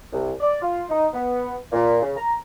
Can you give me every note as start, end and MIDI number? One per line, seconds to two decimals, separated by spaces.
0.13 0.32 36
0.41 0.58 74
0.61 0.85 65
0.90 1.07 63
1.14 1.56 59
1.72 2.01 46
2.02 2.12 49
2.17 2.35 82